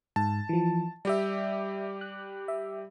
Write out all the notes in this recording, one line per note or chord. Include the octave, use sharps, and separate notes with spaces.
G#2 A5
E3 F3
G3 G4 D5 E5
F#6
E5